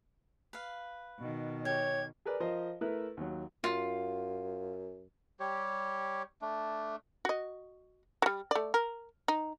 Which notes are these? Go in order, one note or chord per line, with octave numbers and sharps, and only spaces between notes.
B4 F5
B2 D#3
G4 C#5 G#6
G#4 A#4 B4 D5
F3 A#4 C5 D#5
A3 E4 A#4 B4
D#2 F#3
F#2 F4
G3 G4 C#5
A3 D4
F#4 D#5
F#3 G3
A3 D5
A#4
D#4